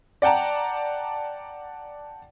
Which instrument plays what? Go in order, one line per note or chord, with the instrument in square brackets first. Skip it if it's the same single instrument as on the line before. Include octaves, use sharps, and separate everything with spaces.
[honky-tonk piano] D5 F#5 G5 A5 A#5